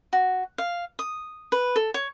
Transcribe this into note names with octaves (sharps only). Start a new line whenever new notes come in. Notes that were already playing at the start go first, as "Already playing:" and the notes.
F#4
F5
D#6
B4
A4
C#5